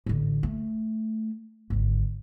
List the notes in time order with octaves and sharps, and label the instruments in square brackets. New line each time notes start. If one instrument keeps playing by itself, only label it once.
[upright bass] A1 D3
A3
G#1 D3